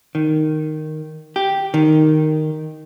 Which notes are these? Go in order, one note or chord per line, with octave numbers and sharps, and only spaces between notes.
D#3
G4
D#3